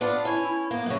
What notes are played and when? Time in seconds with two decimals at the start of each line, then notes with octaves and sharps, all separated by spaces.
0.01 B3 D4 F4 D5
0.25 C#4 E4
0.44 E4
0.71 A#3 B3
0.86 A2 C#3 F#3